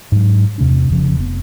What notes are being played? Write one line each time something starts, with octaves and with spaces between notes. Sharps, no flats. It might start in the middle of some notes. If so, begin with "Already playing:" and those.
G#2 F#3
E2 C3 A3 D4
F1 F2 C#3 F3
F1 B3